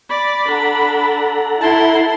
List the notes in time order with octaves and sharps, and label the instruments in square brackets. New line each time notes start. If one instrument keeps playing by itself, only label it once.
[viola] D5 [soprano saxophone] B5
[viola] D4 [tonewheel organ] A4 F#5 A#5
[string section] E4 [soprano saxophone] A5 [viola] C6